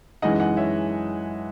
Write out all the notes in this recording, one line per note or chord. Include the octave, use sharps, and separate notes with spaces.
F#2 E3 G#3 D#4 D#5 F#5
D#5 F#5
C#5 E5